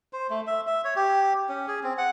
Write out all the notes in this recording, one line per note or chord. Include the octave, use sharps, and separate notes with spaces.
C5
A3
E5
E5
C#5
G4
C#4
G#4
C4
F#5